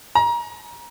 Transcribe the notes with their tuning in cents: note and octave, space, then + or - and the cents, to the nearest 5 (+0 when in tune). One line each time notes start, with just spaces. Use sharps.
A#5 +25